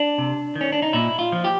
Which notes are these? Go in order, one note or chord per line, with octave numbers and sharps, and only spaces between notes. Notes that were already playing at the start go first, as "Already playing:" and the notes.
Already playing: D4
C3
D#3
C#4
D4
D#4
A#2 E4
F4
F3
G4